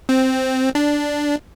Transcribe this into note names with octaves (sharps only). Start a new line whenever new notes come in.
C4
D4